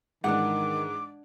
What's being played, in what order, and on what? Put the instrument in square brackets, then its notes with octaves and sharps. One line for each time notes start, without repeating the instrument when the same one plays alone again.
[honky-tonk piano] G#2 E3 [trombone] D#3 [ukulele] D4 D#4 F#5 [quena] D6